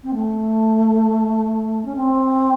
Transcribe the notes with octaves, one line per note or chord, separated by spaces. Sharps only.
C4
A3
C#4
C4